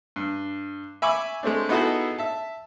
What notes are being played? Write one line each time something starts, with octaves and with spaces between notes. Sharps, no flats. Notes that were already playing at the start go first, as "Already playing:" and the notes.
G2
E5 G#5 B5 C#6 D6
G#3 A3 C4 D4
B3 D#4 E4 F#4 G#4 A4
E5 A5